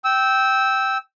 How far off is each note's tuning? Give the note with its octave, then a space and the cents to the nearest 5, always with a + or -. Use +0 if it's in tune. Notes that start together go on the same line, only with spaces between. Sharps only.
G5 -10 E6 -15